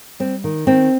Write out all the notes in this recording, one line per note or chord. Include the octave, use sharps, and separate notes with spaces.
G3 C4
D#3
D#3 C4